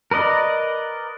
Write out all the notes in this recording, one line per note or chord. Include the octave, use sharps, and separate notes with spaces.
A#4 B4 D5 D#5